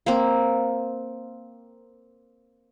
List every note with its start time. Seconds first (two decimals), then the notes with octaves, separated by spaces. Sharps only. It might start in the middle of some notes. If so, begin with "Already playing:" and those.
0.06 A#3 C4